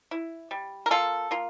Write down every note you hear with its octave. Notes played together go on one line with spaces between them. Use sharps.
E4
G3
A#4
A#3 F4 A4
A#3 F4